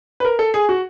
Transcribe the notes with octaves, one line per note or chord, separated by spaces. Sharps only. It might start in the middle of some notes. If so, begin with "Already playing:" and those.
B4
A#4
A4
G#4
F#4